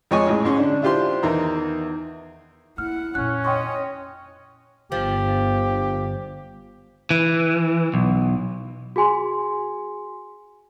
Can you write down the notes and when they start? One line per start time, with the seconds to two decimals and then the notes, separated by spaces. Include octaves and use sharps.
0.11 F2 G#3 C#5 D#5 G#5 C#6
0.27 A1 A2 G#3
0.44 G#2 G#3 C#4
0.59 D3 D4
0.82 D4 E4 F4 G4 C5 C6
1.23 E2 D#3 D#4 A#5
2.78 A#3 E4 F#5 F6
3.15 F2 A#2 C#4 F#6
3.45 C#5 D#5 G5 C6 C#6
4.92 G1 F3 G4
7.11 E3
7.94 B1
8.96 F#4 G#4 G#5 C6